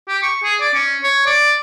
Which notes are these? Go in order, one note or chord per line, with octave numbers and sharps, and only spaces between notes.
G4
C#6
G#4
D5
C#4
C#5
D5